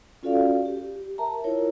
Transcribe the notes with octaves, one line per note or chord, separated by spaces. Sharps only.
C#4 F4 F#4 A4 D5 F5
G4
A#4 E5 A5 A#5
E4 F4 A#4 C#5